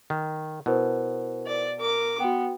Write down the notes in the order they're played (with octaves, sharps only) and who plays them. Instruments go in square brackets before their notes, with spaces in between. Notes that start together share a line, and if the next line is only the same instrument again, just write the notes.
[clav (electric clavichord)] D#3
[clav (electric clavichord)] B2 [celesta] E4 A#4 C5
[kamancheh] D5
A#4 D6
[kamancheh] B3 [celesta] F#4 G5